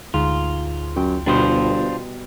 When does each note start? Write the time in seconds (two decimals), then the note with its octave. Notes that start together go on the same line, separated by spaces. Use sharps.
0.14 D2 G#2 F4
0.96 F#2 G5
1.26 G1 B2 G3 D4 F4 C5